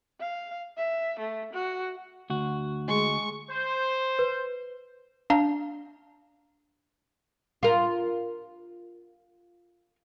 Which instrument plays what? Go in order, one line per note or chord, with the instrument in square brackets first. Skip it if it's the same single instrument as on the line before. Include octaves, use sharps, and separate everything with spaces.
[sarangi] F5
E5
A3
F#4
[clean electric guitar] D2 F#4
[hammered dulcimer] G#3 [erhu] C#6
[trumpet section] C5
[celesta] B4
[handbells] D4 F5 A#5
[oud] F4 A#4